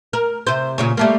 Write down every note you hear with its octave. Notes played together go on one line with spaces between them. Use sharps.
A#4
C3 C5
A#2 C#3 C#5
G3 A3 A#3